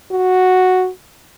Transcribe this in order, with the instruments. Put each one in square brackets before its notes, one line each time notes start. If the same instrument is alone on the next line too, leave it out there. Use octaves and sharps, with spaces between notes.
[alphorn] F#4